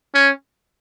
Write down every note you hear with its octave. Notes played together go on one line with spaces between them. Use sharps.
C#4